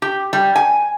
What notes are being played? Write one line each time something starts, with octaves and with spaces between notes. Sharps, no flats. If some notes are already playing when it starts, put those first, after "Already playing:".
G4
G3
G#5